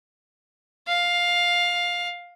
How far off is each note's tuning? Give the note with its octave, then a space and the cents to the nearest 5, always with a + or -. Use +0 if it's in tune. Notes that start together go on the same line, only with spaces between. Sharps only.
F5 +10